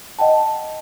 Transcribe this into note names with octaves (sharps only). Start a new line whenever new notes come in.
D#5 F#5 G5 A5